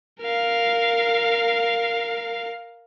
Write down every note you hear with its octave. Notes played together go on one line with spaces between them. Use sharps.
A#4 F5